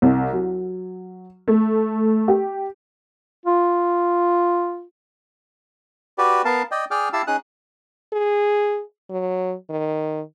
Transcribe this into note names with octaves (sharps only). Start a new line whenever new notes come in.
C2
F#3
A3
G4
F4
F#4 G4 B4 D5
B3 A#4 F5 A5
D5 D#5 G5
G#4 D5 G5 D6 F6
E4 G4 F5 A5 E6
C#4 D#4 G#4 D#6 F#6
G#4
F#3
D#3